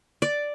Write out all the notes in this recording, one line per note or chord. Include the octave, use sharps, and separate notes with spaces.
D5